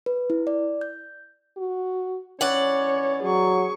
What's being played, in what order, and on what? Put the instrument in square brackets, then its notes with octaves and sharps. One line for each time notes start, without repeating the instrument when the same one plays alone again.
[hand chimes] B4
E4
D5
G6
[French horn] F#4
[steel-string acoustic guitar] E3 D5 F#5 [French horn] C#4 [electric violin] C#5
[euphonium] F#3 [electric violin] G#4 C#6